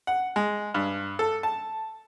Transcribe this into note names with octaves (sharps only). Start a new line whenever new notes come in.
F#5
G#3
G2
A4
A5